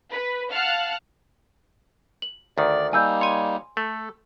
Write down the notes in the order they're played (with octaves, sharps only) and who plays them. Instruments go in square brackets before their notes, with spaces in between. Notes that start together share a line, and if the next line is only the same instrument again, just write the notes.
[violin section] B4
F5 F#5 A5 F6 F#6
[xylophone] F#7
[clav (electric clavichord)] D2 D#3 [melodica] D5
[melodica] G3 A#3 D#4 [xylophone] G#5 E6 G6
[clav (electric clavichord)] C#5 G#5 [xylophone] C6
[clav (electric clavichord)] A3 [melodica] A4